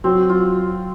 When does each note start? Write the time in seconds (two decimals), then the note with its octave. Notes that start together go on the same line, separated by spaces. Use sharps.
0.04 F#3 C4
0.29 F4